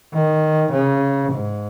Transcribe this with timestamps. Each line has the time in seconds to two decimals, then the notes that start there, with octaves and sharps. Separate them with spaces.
0.14 D#3
0.72 C#3
1.32 G#2